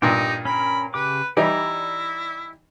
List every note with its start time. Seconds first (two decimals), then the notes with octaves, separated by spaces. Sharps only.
0.02 G2 A#2 D#4 G4 D#5
0.45 C#4 A#4 B5
0.94 C#3 G4 B4 D6
1.37 E3 G3 D#4 E4 D5 A#5